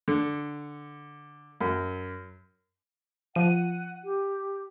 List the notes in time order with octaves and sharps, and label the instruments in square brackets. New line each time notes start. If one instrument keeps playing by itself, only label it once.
[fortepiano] D3
F#2
[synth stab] F3 D#7 [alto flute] F#5
[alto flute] G4